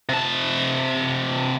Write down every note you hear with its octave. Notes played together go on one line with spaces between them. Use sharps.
C3 A5